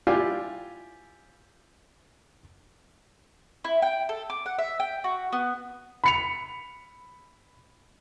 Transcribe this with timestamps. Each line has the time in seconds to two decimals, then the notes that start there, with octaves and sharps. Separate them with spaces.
0.07 E4 F4 G4 D5 F5 G#5
3.64 E4
3.82 G5
4.09 A4
4.30 D6
4.46 F#5
4.59 E5
4.80 G5
5.04 F#4
5.32 B3
6.04 B5 C#7 F7